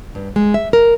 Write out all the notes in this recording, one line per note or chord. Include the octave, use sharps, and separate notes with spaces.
G2
G#3
E5
A#4